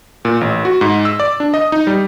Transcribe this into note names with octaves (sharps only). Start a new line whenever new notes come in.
A#2
A1
F#4
G#2
E6
D5
D4
D#5
D#4
G3